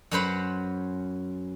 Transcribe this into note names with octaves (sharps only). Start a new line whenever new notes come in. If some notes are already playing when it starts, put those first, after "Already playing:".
F#2 F#3 C#4 B4 C5 B5